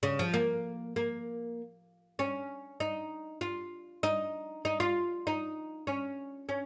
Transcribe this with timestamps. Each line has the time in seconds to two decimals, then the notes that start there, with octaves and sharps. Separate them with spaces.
0.03 C#3
0.19 F3
0.34 A#3
0.96 A#3
2.19 C#4
2.80 D#4
3.41 F4
4.03 D#4
4.65 D#4
4.80 F4
5.27 D#4
5.87 C#4
6.49 C#4